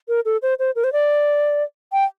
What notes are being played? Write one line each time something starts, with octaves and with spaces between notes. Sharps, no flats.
A#4
A4
C5
C5
A#4
C5
D5
G5